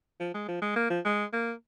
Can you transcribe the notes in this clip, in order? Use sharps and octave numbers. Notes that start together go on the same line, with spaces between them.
F3
G#3
F3
G#3
A#3
F3
G#3
A#3